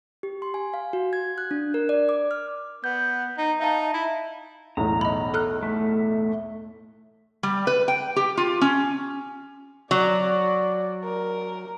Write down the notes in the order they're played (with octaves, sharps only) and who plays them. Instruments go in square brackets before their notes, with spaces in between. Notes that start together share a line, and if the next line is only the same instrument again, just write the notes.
[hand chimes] G4
C6
G#5
F5
F#4
G#6
F#6
D4
A#4
D5
D6
F6
[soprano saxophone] B3 [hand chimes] G6
[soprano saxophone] D#4
[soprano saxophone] D#4 [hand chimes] E5 F5 A5
[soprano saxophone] E4
[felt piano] B1 E2 A2 [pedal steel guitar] A#5
[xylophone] D#5 B5
A4 F6 F#6
[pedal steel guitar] A3
[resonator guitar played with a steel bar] G3
B4
G5
G4
F4
C#4
[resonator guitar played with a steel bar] F#3 [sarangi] D5
[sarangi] A#4